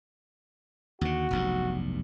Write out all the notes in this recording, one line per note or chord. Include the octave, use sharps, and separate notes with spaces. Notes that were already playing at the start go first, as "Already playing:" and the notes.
D#2 D3 F#4
F1 B1 G2